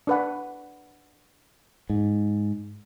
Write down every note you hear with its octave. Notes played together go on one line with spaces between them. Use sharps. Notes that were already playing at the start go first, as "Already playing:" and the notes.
D4 B4 F#5
G#2